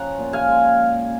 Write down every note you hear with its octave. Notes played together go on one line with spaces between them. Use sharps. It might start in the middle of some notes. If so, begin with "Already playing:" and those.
Already playing: F3 C#4 F#5 A#5
A#2
F5 G#5
G#3